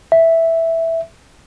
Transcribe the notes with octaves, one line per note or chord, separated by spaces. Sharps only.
E5